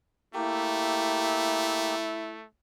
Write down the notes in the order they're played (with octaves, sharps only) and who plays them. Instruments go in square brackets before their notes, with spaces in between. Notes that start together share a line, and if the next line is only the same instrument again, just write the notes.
[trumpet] A3 [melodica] A#3 G4 [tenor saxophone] E4